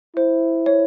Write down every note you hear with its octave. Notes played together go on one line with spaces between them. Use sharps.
E4 C5
C#5